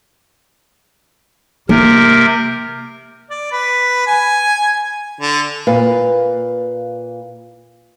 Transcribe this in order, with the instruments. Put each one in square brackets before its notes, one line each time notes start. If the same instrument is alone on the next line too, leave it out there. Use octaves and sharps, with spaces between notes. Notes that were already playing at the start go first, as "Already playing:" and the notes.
[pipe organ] C3 A#4 [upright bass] A#3
[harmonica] D5
B4
G#5
D3
[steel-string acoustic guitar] A#2 B4 F5